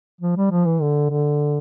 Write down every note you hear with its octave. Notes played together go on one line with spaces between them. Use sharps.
F3
G3
F3
E3
D3
D3